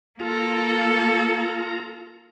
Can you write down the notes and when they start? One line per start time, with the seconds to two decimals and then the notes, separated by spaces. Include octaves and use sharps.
0.20 A#3 F4 A4 A#5